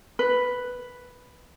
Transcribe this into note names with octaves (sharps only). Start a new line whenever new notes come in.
B4